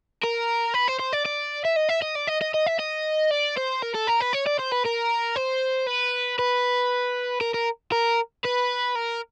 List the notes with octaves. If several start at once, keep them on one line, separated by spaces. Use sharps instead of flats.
A#4
B4
C5
C5
D5
D5
E5
D#5
E5
D#5
D5
D#5
D#5
D#5
E5
D#5
D5
C5
A#4
A4
A#4
B4
C#5
D5
C5
B4
A#4
C5
B4
B4
A#4
A#4
A#4
B4
A#4